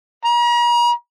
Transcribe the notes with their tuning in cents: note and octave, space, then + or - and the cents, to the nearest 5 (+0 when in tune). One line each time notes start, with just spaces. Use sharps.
A#5 +40